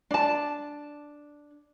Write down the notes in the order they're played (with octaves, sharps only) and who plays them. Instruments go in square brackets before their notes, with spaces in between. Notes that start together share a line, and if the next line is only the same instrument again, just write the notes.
[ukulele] D4 A5